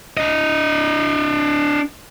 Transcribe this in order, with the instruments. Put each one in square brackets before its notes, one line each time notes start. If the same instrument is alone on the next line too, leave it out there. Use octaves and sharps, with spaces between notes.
[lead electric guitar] D4 D#5